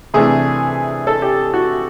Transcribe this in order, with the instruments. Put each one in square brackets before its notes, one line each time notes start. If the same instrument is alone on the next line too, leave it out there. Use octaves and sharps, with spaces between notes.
[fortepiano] C3 E3 A3 D4 G#4
A4
G4
F#4